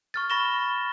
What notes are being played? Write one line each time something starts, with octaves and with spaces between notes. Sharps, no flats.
C#6 F6 A6
B5 C#6 A#6 E7 G7